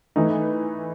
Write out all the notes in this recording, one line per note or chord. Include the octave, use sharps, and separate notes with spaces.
E3 A3 D#4